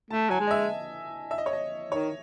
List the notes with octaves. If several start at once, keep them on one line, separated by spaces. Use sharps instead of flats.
A3 A5
F#3 G#5
G#3
D#5
E5
E5
D#5
C#5
D#5
D#3 C#5